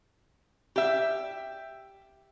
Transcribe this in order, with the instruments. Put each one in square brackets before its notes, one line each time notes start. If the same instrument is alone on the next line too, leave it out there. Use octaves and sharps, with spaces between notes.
[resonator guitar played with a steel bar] G4 E5